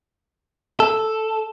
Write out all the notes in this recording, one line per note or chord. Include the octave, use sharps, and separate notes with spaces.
A4